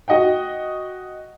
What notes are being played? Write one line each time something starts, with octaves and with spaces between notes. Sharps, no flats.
F#4 D#5 F#5 G5